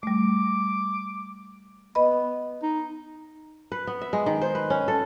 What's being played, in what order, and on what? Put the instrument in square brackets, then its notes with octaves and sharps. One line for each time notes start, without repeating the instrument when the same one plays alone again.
[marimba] G3 A3 [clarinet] D6
[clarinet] B3 [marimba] B4 D#5 B5
[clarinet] D#4
[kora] B4
B3
E5
G#3
D#3
C5
B4
C#4
A4